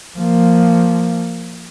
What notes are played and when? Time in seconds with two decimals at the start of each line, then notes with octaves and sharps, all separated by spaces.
0.18 F3 A#3